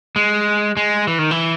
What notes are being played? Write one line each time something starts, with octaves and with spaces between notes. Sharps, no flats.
G#3
G#3
E3
D#3
E3